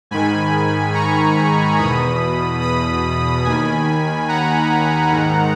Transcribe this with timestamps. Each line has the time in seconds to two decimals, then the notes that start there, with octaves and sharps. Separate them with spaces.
0.11 G#2 D#3 G#5 B5
0.94 A#5 C#6
1.78 E2 B2 B5 D#6
2.61 B5 D#6
3.44 D#2 D#3 G#5 B5
4.28 F#5 A#5
5.12 G#2 D#3